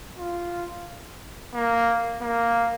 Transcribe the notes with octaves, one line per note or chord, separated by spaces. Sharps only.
F4
A#3
A#3